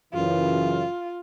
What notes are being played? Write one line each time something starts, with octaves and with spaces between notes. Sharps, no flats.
F#2 C#3 E3 F4